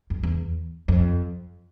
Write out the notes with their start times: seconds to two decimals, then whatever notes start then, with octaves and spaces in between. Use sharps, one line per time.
0.10 F2
0.23 E2
0.88 F2